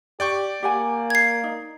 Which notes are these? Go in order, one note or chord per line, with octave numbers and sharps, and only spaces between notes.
G4 D5 G5 C#6
A#3 G4 F#5 G#5
G#6 C7
D#4